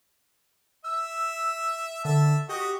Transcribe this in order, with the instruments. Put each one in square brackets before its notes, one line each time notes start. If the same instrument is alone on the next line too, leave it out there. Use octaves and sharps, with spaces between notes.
[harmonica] E5 [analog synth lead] E6
[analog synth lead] D3 [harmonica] E5 A5
[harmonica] F#4 D#5 [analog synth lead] G4